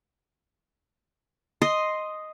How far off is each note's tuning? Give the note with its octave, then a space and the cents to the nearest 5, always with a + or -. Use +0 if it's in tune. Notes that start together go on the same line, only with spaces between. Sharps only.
D#5 +0 C6 +0